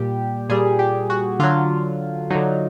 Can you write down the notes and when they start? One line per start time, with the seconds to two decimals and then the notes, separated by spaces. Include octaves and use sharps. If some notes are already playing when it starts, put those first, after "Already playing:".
Already playing: A#2 G3 G4
0.49 A#2 G3 G#4
0.79 G4
1.10 F#4
1.39 D3 F#3 F4
2.30 D3 F#3 D#4